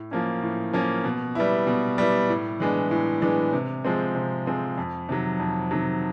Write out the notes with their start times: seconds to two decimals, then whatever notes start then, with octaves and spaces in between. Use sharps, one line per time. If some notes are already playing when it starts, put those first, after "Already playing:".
Already playing: A2
0.11 F3 A#3 C#4
0.43 A2
0.73 F3 A#3 C#4
1.04 B2
1.35 G3 B3 E4
1.67 B2
1.98 G3 B3 E4
2.29 A2
2.60 E3 G#3 B3 D4
2.91 A2
3.22 E3 G#3 B3 D4
3.53 C3
3.85 F3 G#3 C4
4.15 C3
4.46 F3 G#3 C4
4.78 F2
5.09 C3 D#3 F#3
5.40 F2
5.71 C3 D#3 F#3